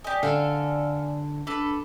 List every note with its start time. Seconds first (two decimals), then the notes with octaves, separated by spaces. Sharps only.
0.04 G4 D5 D#5 G#5
0.23 D3 A4 F5
1.47 D4 A4 B4